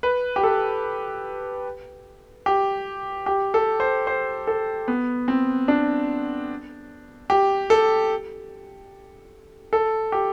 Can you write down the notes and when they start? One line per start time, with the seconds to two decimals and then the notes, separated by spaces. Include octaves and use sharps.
0.03 B4
0.36 G4
0.43 A4
2.46 G4
3.26 G4
3.54 A4
3.80 C5
4.07 C5
4.47 A4
4.88 B3
5.28 C4
5.68 D4
7.30 G4
7.70 A4
9.73 A4
10.12 G4